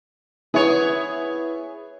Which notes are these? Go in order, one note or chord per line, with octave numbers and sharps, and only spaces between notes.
B3 E4 G#4 C#5 E5